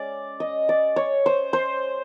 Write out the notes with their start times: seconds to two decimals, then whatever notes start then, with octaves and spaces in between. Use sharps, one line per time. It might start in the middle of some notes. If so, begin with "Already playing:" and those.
Already playing: G#3 C#4 D5
0.40 D#5
0.69 D5
0.96 C#5
1.26 C5
1.53 C5